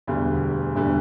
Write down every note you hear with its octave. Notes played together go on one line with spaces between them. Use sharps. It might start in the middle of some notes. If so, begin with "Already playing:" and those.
E1 D2 D3 G3 B3
E1 D2 D3 G3 B3